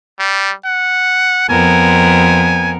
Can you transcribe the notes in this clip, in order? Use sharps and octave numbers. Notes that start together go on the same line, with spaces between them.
G3
F#5
F2 B3 A#4 G#5